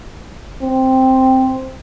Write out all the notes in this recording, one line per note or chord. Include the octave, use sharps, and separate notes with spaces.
C4